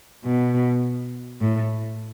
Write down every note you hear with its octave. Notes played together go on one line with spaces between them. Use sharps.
B2
A2